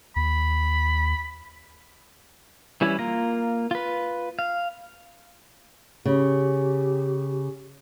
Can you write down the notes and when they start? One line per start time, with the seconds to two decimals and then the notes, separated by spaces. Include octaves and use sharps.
0.16 D#2 B5
2.81 E3 G3 C#4 E4
2.99 A#3 F4 A#5
3.71 F4 B4
4.39 F5
6.06 C#3 G4